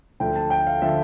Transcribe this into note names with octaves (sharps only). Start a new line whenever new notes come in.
D2 D3 F3 G5
A5
G5
F5
D3 F3 E5